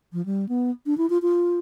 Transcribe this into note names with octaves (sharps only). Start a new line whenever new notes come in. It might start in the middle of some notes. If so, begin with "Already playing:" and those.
F3
G3
B3
D4
E4
F4
F4